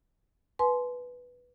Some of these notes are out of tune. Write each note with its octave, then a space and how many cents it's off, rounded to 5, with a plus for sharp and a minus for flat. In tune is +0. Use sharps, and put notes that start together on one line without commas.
B4 +0 G#5 +45 C6 -10